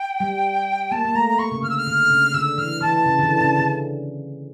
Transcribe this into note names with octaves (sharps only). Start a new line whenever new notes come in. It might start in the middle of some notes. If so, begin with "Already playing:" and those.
Already playing: G5
G3
A#3 A5
A#3
A3 A#5
A#5
A#3 C#6
C#3
D3 F6
E6
F6
D3
C#3
D3 E6
E3 F6
E3 A5
C#3
D3
E3
C#3
D3